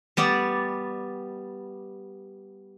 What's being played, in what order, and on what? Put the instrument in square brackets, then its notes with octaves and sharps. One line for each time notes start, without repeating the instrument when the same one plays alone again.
[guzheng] G3 B3 D5